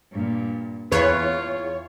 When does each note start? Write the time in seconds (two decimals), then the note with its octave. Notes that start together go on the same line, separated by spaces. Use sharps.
0.11 G2 A#2
0.92 E2 F4 B4 C#5